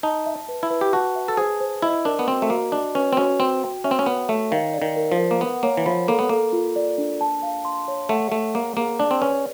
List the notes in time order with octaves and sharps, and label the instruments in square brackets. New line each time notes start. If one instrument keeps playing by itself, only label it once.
[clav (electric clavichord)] D#4 [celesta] A5
[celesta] E5
B4
[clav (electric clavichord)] E4
[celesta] B4
[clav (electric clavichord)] G4
[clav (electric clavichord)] F#4 [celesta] A5
[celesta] E5
[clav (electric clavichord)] A4
[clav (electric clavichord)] G#4 [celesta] C5
[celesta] C5
[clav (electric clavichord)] E4 [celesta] D#5
[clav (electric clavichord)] D4 [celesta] A#4
[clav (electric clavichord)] B3
[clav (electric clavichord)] C4 [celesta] F#4
[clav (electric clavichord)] A3
[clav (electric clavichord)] A#3 [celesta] F#4
[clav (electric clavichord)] D4 [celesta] D#5
[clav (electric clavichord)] C#4 [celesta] B4
[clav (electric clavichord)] C4
[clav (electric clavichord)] C#4 [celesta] F#4
[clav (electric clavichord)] C4 [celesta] F#4
[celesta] G5
[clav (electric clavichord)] C#4 [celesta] E5
[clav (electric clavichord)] C4
C#4
[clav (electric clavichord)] B3 [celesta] C#5
[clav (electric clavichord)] A3 [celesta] C#5
[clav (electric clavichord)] D#3 [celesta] F5
[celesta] D5
[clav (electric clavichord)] D#3
[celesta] A#4
[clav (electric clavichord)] F3
[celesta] A#4
[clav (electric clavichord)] A#3
[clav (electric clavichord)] B3 [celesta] F#5
[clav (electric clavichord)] A#3 [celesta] C#5
[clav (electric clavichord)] E3
[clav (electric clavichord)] F3 [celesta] B5
[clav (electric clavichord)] A#3 [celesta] A4
[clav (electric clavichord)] B3
[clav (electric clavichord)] A#3 [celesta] A4
[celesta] F4
D5
D4
A5
F5
C6
C#5
[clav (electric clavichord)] A3 [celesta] F#5
[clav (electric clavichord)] A3 [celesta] C#5
[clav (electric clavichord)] A#3 [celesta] G#4
[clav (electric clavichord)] A#3 [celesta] G#4
[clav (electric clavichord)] D4 [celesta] D5
[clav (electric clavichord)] C4
[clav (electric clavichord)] C#4 [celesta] B4